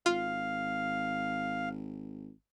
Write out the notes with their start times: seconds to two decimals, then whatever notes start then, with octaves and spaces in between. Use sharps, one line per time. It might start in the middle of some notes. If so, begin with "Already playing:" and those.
0.06 G#1 F4 F5